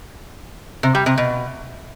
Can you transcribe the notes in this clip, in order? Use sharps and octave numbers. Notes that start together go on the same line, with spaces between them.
C3
G3
C3
B2